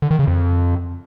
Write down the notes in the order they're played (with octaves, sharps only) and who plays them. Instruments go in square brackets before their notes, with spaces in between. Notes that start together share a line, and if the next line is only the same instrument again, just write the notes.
[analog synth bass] D3
D#3
C#3
F2